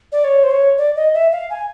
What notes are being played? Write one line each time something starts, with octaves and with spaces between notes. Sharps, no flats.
D5
C#5
C5
C#5
D5
D#5
E5
F5
G#5